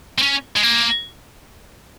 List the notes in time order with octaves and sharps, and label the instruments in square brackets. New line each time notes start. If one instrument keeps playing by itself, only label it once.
[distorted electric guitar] C4
C#4
G#3
A#3